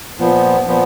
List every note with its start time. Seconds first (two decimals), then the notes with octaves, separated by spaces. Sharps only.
0.19 A#2 F3 B3
0.67 A#2 F3 B3